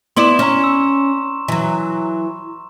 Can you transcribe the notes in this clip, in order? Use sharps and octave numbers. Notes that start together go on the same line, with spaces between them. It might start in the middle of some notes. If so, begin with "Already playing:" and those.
B3 E4 D5 C6 E7
C#4 A#5 C#6
E6
E3 F#3